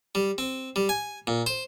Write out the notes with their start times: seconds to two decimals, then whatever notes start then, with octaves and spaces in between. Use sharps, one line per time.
0.15 G3
0.38 C4
0.76 G3
0.89 G#5
1.27 A#2
1.46 C5